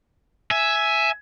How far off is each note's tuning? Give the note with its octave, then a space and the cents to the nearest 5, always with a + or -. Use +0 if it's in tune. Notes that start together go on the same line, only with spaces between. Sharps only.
E5 +0 G#5 +10